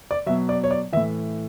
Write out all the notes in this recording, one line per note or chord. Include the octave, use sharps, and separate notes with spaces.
D5
B2 F#3 E5
D5
C#5
D5
A2 E3 E5